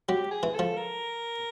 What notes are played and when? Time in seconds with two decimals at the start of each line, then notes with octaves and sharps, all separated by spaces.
0.09 F#3 G4
0.31 G#4
0.43 E3
0.54 F3 A4
0.77 A#4